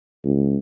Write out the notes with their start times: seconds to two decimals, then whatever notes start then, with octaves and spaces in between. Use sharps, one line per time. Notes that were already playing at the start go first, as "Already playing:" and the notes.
0.24 C#2